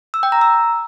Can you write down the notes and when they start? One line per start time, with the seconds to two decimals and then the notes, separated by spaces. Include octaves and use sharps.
0.14 E6
0.23 G5
0.32 A#5
0.41 E6